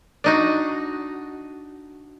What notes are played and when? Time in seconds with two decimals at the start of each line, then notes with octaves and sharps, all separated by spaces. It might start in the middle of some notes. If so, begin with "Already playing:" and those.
0.24 D4 D#4 F#4